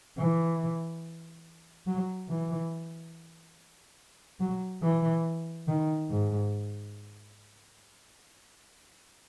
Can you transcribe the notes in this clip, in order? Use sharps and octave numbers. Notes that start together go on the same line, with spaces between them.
E3
F#3
E3
F#3
E3
D#3
G#2